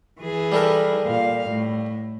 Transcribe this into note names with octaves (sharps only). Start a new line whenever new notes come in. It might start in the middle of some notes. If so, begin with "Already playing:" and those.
E3 G#4
G3 A4 A#4
A#2 F5
A2